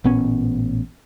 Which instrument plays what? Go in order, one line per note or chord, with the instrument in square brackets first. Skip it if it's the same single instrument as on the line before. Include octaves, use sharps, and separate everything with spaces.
[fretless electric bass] A1 A#2 B3 C#4